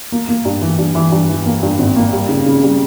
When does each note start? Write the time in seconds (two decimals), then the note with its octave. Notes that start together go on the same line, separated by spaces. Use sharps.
0.12 A#3
0.29 A#3
0.45 G2
0.61 E3
0.78 G2
0.95 E3
1.12 G2
1.29 E3
1.46 A#3
1.63 G2
1.79 G#1
1.96 A#3
2.13 G3
2.29 C#3
2.46 C#3
2.63 G3